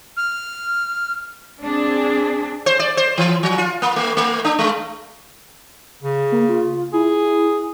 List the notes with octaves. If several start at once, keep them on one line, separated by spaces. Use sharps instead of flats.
F6
C4 D4 G#4
C5
D5
C5
E3
F3
F4
A#3
A3
A3
D4
G#3
C#3
A#3
F4
E4 G#4